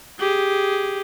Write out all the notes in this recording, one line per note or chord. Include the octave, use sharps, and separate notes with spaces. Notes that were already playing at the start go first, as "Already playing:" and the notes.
G4 G#4